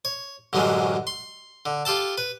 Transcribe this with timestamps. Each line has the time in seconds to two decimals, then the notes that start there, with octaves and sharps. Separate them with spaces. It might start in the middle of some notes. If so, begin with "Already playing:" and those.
0.05 C#5
0.53 A1 F#2 D3 E3 F#3 G#3
1.07 C6
1.66 D3
1.85 F4 G4 A4 A5
2.18 B4